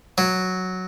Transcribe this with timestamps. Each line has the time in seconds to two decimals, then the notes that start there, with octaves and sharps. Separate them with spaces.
0.18 F#3